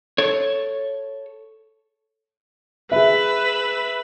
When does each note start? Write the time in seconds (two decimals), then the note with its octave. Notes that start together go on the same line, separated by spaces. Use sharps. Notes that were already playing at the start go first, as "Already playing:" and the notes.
0.18 A4 C#5
2.92 G#4 B4 E5 B5 E6